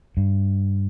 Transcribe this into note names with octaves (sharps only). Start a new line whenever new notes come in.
G2